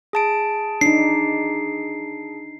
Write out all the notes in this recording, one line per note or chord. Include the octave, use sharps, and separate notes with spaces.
G#4 A5 D7
D4 D#4 C7